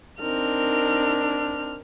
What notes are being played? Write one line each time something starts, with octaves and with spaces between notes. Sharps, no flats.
C4 D4 D#4 A#4 F6